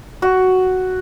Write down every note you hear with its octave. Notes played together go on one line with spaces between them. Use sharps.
F#4